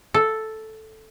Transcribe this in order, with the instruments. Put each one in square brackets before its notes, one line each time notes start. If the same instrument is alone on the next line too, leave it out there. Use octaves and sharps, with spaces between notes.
[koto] A4